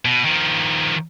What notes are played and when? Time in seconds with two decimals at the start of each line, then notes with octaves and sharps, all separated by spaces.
0.05 B2
0.25 D#3 F3